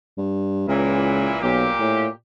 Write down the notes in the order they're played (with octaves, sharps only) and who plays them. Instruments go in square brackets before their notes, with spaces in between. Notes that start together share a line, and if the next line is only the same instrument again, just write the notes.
[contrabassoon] G2
[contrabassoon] C#2 [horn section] A#2 E3 E4
[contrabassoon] B1 [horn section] A#2 G4
[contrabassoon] A2